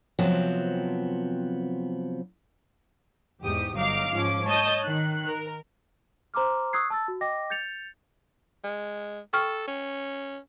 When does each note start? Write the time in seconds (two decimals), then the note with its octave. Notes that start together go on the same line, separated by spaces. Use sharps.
0.19 C3 F3 F#3 B3 C4
3.44 E2 G#2 G4 D#6
3.75 G1 F#3 D#4 F5 D6 F6
4.12 G#2 F3 C#4 D6
4.46 C#5 D#5 A5 D#6 G6
4.82 D#3 F#6
5.27 A#4
6.34 C5 A#5 C6 D6 F6
6.73 C#6 D#6 E6 F#6 G#6 C7
6.90 A5 E6 A6
7.08 F#4
7.21 D#5 G5 D6 A#6
7.50 G6 A6 C#7 F7
8.64 G#3
9.33 A4 G5 C#6 F6
9.68 C#4